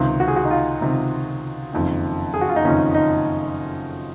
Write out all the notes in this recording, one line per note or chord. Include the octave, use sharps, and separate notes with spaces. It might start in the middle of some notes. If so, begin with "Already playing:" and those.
Already playing: C#2 C3 D#3
F#4
G#4
F#4
D#4
F4
C#2 C3 D#3
F#1 F2 D#3
G#4
F#4
F4
D#4
F#1 F2 D#3 C#4
D#4